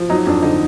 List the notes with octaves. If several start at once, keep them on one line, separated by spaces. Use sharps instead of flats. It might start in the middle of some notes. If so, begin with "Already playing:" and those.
Already playing: F3
F#3 D#4
F2 D4
D3 D#4